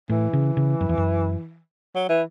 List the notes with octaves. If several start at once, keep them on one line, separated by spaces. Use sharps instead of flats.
A2 E3
C#3
C#3
F#2
E2
F#2
F#3
E3